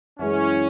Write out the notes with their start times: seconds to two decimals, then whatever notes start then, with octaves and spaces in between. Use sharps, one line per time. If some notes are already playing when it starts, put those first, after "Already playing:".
0.19 F#2 E3 G#3 C#4